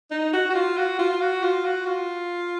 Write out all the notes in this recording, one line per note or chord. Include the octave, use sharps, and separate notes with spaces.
D#4
F#4
F#4
F4
F#4
F4
F#4
F4
F#4
F4